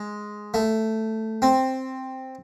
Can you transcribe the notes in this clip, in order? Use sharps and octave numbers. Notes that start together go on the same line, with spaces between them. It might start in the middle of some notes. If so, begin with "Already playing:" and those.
Already playing: G#3
A3
C4